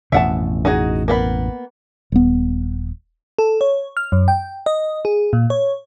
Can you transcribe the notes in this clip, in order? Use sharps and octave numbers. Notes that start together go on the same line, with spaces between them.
A1 F2 B2 E5 F#5 A5
D#4 F#4 G#4
A#3 B3 B5
D#1 B3
A4
C#5
F6
F#2
G5
D#5
G#4
A#2
C#5